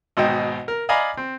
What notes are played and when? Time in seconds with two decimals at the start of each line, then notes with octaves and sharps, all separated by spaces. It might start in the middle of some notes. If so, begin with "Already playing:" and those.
0.17 G#1 G#2 B2 D#4 D#5 G5
0.68 A#4
0.89 D5 D#5 F5 G#5 A#5 B5
1.17 C4